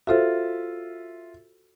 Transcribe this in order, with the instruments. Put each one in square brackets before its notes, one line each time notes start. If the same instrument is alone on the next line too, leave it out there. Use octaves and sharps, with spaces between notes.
[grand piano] F4 E5 [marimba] F#4 A4 C5